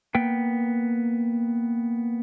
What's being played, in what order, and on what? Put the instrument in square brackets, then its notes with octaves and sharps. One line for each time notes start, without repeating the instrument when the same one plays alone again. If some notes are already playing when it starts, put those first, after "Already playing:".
[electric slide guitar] A#3 B3 G5